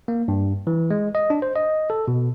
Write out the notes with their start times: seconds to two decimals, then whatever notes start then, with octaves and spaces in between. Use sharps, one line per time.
0.08 A#3
0.28 G2
0.67 E3
0.90 G#3
1.15 D#5
1.30 D4
1.42 C5
1.56 D#5
1.90 A4
2.08 B2